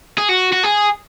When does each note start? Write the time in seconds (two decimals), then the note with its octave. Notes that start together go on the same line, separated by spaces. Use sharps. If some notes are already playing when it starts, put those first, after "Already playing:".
0.18 G#4
0.29 F#4
0.53 F#4
0.64 G#4